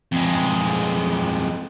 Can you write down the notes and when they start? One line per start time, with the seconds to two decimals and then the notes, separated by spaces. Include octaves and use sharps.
0.12 F2 G#3